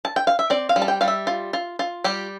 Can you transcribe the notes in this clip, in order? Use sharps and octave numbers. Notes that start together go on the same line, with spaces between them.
A5
G5
F5
E5
C4 D5
F5
G3
A5
G5
G3 F5
E5
F4
F4
F4
G3 G4